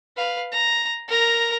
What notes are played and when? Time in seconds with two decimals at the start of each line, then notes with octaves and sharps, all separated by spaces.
0.17 B4 F5
0.52 A#5
1.08 A#4 A#5